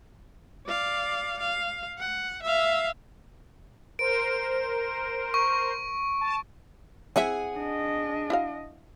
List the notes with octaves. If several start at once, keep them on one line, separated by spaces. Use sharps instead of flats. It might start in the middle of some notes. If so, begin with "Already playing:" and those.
D5 F5
F5
F#5
E5 F5
A#4 C5 D7
C#6
A5
C4 E4 G#4 E5 F#5 G#5
D4 D#5
E4 F#4 F5